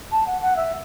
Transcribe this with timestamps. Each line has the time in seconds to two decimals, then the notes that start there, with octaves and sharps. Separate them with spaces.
0.12 A5
0.27 F#5
0.42 F#5
0.56 E5